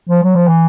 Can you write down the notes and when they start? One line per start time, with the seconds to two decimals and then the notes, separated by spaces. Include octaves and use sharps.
0.09 F3
0.23 F#3
0.35 F3
0.48 E3